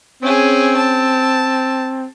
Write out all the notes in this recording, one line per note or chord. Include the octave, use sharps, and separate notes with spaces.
C4 C#4 G#4
A5